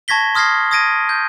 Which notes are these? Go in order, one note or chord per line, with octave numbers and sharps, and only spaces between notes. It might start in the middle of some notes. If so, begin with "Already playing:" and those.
A5 C#6 G#6 A#6 B6 G7
C6 D#6 F6 G#6 A#6 C7
D#6 G#6 A#6 D7 D#7
G6